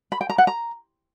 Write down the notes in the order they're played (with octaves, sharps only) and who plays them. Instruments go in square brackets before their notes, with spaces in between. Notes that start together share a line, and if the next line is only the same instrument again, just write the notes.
[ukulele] B5
G5
A#5
F#5
A#5